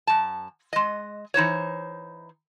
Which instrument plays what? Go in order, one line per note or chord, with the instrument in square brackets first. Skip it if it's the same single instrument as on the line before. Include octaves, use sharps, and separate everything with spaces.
[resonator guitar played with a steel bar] F#2 A5
G#3 D#5
E3 D#4 C5 C#5